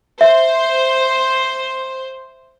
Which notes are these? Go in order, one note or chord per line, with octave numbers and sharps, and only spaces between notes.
C5 E5